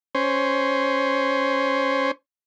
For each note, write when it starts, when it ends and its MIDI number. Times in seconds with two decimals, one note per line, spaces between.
0.15 2.11 61
0.15 2.11 72